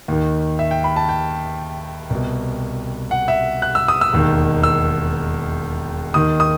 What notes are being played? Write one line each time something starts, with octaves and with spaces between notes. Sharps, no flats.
D#2 D#3
E5
G5
B5
A5
G5
C2 B2
F#5
E5
F#6
E6
D#6
E6
E1 D#2 D#3
E6
D#2 D#3 D#6
D#6